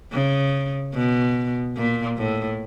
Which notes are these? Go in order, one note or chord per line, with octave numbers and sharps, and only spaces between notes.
C#3
B2
A#2
A2